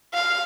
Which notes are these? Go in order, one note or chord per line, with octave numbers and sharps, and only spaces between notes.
F5